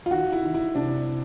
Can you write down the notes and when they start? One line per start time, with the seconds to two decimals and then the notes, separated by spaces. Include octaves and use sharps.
0.06 F4
0.11 D#3 F#4
0.32 E4
0.43 D#3
0.54 E4
0.75 C3 D4